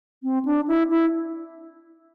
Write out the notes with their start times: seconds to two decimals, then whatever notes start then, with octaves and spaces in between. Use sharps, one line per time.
0.23 C4
0.45 D4
0.68 E4
0.90 E4